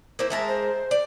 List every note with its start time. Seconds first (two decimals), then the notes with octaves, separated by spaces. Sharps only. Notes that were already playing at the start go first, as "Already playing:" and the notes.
0.19 A#3 E4 C5
0.30 G#3 A#4 E5 A5
0.48 C5
0.91 D5